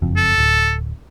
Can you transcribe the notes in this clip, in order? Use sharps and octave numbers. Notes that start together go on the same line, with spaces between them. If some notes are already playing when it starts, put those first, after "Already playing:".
F#1 F2
A4
D1